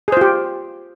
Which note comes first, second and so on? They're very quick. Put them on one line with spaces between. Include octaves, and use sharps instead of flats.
G#4 C5 F4 G4